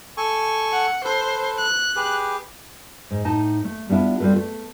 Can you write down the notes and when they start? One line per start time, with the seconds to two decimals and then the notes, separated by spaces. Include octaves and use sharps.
0.17 A4 G#5 C#6
0.72 F#5
1.04 A4 B4 C5
1.58 F#6
1.96 G4 G#4 B4
3.11 G#2
3.25 A2 D#4 A5
3.65 A3
3.89 G3 B3 D4 E4 F4
4.20 G3 C4 F4 A4 B4
4.36 A3